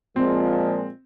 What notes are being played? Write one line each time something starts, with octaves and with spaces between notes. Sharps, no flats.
A#2 F3 G#3 C4